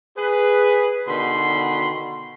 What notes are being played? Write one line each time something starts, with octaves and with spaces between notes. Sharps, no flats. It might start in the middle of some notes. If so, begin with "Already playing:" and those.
G#4 B4
B2 D3 D#3 B5 C6